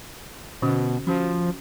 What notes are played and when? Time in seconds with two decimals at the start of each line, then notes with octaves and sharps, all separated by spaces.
0.62 B2 D3 C#4 F#4
1.07 F3 C#4 F#4